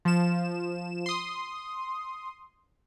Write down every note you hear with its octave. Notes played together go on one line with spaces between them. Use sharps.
F3 E7
C6 D#6